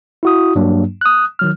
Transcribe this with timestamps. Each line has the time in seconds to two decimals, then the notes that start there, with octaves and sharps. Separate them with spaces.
0.23 E4 F#4 D#6
0.55 G2 F#3 A#3 D4
1.01 D#6 F#6
1.39 D#3 F#3 F6